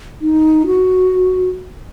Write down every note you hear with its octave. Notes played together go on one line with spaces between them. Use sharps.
D#4
F#4